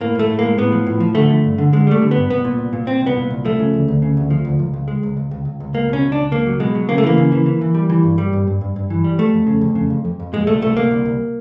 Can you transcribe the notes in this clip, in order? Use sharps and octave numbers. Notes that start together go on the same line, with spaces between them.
A2 A#3
A2 A3
A2
G#3 A#3
A2 B3
F3
A2
F3
D3 A3
D3
G2
D3
D3 G#3
G3 A3
D3
B3
G2
C2 B3
A#2
C2
A#2
A#2 C4
C2
B3
A#2
C2
F3 A3
C#3
D2
D2
C#3
D2
F3
D2
C#2
C#2
G#3
C#2
C#2
C#2
C#2
C#2
C#2 A#3
B2 C#4
C#2
D4
C#2
C#2 A#3
F#3
B2 G#3
F#3
C#3 A#3
A3
E3 A#3
C#3
E3
E3
E3
G3
E3
G2
G3
G2
G2
G2
G2
E3
G3
F2 A3
F2
C#3
F2
C#3
F2
F2
F2
A#2 G#3
C2 A3
C2 A3
C2 A#3
C2
C2